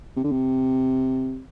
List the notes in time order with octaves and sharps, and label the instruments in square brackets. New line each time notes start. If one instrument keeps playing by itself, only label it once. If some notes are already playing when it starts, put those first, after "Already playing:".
[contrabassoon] C3
D3
C3